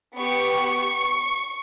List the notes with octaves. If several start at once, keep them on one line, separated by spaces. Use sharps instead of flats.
B3 G4 C#6